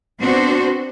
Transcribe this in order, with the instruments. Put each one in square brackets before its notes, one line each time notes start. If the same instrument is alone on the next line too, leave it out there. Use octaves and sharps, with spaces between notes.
[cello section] B3 C4 D4 F#4 C5